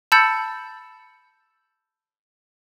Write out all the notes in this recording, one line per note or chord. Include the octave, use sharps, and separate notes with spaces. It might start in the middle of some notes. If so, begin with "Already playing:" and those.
A5 B5 E6 G6 A6 C#7